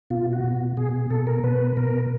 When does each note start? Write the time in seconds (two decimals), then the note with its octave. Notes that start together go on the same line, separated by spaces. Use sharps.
0.10 B2 F4
0.33 F#4
0.44 B2
0.77 B2 G#4
1.10 B2 A4
1.27 A#4
1.44 B2 B4
1.77 B2 A#4